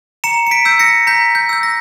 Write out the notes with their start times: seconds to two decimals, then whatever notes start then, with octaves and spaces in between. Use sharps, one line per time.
0.24 A#5 C#7 E7
0.47 C#7
0.51 B6 D7
0.65 E6 G6
0.79 A#6 C#7
1.07 A#5 G6 B6
1.35 G6
1.49 E6 G6
1.63 A#6